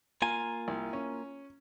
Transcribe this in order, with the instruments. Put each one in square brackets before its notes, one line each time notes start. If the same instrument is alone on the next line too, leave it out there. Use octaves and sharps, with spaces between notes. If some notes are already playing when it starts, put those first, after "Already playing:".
[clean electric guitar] A#3 F4 G#5 [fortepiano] A#5
[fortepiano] C2
C#4